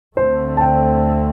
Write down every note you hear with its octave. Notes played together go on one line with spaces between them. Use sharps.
D2 D3 A3 C4 C5
A5
G5